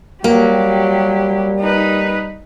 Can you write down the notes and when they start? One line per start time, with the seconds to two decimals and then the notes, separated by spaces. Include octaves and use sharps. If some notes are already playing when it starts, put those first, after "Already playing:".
0.24 F#3 G3 A#3 G4
1.60 D#4 B4